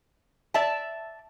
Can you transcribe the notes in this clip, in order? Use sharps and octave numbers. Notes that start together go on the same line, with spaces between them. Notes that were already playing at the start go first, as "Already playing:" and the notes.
D5 E5 A5